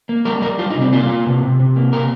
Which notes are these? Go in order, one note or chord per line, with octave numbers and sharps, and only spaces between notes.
A#3
G3 A#4
G3 A#4
G3 F4
D#4
C3
C4
A#3 F4
A#3
C3
C3
C3
A#3
C3 A#4